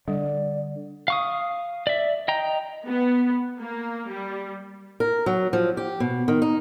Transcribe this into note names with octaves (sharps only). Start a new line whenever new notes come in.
D3 G3 D5
F5 C#6 D#6
D5 E5
D#5 G5 A#5
B3
A#3
G3
A#4
F#3
F3
G4
B2
D#3
D#4